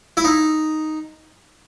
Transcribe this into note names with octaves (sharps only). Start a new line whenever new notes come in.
E4
D#4